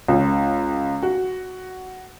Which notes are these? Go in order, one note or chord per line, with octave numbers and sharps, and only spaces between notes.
C#2
F#4